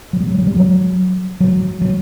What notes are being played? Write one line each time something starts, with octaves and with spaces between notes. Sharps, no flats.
F#3
G3
F#3
F#3
G3
F#3
F#3
F#3